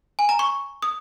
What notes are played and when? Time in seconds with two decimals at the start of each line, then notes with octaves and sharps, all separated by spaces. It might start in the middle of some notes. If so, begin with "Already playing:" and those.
0.19 G#5
0.29 A#5
0.39 C#6
0.82 D#6